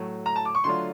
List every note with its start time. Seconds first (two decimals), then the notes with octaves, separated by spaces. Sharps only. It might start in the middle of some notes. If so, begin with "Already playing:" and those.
Already playing: A2 F#3 A3
0.26 A#5
0.36 A5
0.45 D6
0.55 C#6
0.64 D3 F#3 A3 D4 F4 C6